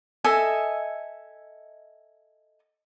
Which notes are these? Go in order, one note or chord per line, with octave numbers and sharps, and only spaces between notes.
A4 D#5 E5 G#5